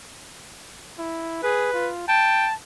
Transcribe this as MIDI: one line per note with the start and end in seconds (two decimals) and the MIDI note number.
0.99 1.41 64
1.43 1.73 68
1.43 1.89 71
1.74 2.04 65
2.08 2.47 79
2.08 2.54 81